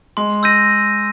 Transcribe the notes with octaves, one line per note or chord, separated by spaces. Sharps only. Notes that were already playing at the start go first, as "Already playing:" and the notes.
G#3 C6
E6 G6 A#6 D#7